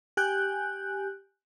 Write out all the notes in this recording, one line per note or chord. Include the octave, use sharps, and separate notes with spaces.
G4 G#5 F#6 G6